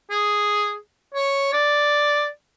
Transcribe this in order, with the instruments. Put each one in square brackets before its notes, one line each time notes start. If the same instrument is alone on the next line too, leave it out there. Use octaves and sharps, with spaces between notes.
[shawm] G#4
C#5
D5